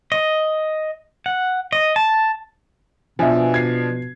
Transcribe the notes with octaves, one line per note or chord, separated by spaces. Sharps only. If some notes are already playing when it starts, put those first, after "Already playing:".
D#5
F#5
D#5
A5
B2 F3 D4 E5 G#5
G#6 C7